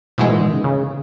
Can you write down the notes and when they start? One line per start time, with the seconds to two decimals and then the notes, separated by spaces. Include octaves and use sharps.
0.18 G#2 B2 E3 G#3
0.29 A#2
0.41 D#3
0.53 C#3
0.64 C#3